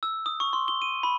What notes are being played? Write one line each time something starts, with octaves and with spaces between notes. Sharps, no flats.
E6
D#6
C#6
C6
G7
D#7
B5